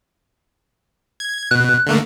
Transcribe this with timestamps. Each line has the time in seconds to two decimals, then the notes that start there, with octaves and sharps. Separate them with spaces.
1.20 G#6
1.51 B2 F#6
1.87 D3 A3 A#3